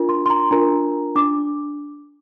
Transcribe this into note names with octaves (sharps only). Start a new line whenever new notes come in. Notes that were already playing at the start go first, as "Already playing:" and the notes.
Already playing: D4 F4 A#4
C6
C6
A#5
D4 F4 A#4 A#5
D4 D6